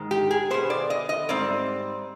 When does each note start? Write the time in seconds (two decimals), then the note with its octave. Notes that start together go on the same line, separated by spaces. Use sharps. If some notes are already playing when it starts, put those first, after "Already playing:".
Already playing: G#2 D#3 G#3
0.11 G4
0.31 G#4
0.50 B2 B3 C5
0.70 D5
0.90 D#5
1.09 D#5
1.29 G#2 G3 C4 D5